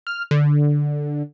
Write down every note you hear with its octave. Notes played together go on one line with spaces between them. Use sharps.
F6
D3